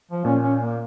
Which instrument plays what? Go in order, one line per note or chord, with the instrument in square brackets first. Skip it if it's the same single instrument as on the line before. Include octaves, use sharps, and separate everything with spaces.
[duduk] F3
[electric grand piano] A#2 [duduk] C#4
[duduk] C#4
A#3